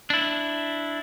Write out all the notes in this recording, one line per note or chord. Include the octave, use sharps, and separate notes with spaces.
D4 E4